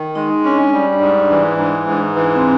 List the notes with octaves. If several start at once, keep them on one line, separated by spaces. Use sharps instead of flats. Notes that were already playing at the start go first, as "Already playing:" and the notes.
Already playing: D#3
G#3 D#4
C#4 D4
G3
G#2
E3
G#2
G#2
E3
C4